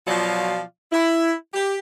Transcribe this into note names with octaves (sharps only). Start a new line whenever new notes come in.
B2 F3 F#3 F4 D5 F5
E4
G4